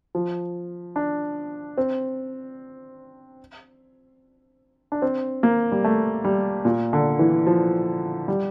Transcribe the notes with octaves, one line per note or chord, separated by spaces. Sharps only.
F3
D4
C4
D4
C4
A#3
G3
A3
G3
A#2
D3
E3
F3
G3